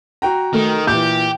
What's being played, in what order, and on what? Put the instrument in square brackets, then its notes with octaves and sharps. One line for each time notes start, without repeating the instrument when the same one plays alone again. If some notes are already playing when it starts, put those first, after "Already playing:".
[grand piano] F#4 G5 A#5
[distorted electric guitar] D#3 [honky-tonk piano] A3
[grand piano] A#2 E3 [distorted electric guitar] G4 [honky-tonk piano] G6